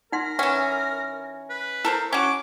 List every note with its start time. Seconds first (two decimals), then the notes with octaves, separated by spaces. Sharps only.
0.12 D#4 A#4 F#5 C6
0.39 E3 C#4 F#5
1.50 B4
1.85 E4 A4 A#4 C5
2.13 C#4 F#4 D6